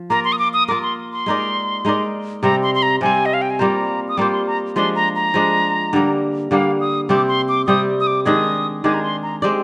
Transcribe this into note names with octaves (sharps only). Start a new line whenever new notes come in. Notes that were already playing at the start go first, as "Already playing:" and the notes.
Already playing: F3
A#3 F4 A#4 A#5
C6
D#6
D6
D#6
A#3 F4 A#4 D6
C6
C6
G#3 D#4 A#4 D5
G#3 D#4 A#4 D5
C3 G3 C4 A#5
C6
C6
A#5
C3 G3 C4 G#5
D#5
F5
G5
G#5
G3 A#3 F4 C5 A#5
D#6
G3 A#3 F4 C5 D6
C6
A#5
F3 G#3 D4 C6
A#5
A#5
F3 G#3 D4
D3 G3 A#3
D3 G3 A#3 F5
D#6
C3 G3 C4 G4 D6
C6
D6
C3 G3 C4 G4 D#6
D#6
D6
D#3 G#3 D4 G#4 D#6
D#3 G#3 D4 G#4 D6
A#5
C6
A#5
G#3 C4 G4 D5 D6